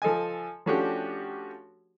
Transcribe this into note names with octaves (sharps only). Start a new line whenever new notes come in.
F3 A4 D#5 G#5
F3 A3 C#4 D4 F#4 G4